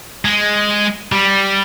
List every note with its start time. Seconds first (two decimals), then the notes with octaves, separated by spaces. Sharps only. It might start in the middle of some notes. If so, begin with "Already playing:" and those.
0.25 G#3
1.12 G3